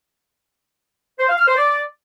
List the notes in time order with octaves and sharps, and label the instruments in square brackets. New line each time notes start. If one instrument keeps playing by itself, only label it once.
[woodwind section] C5
F5
F6
C5
D5